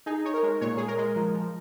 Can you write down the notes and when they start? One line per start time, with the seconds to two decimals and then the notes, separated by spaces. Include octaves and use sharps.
0.06 D#4 G#4
0.25 D#4 C#5
0.34 A#4
0.43 G#3
0.61 A#2 C#5
0.77 G#3 G#4
0.88 A#4
0.98 G#3
1.16 F3
1.34 F3